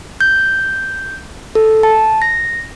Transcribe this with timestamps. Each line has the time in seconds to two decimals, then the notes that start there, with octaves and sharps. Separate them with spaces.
0.21 G6
1.55 A4
1.83 A5
2.22 A#6